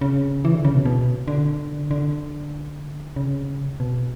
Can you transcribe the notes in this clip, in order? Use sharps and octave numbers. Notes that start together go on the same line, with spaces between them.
C#3
E3
D3
C#3
B2
B2
D3
D3
C#3
B2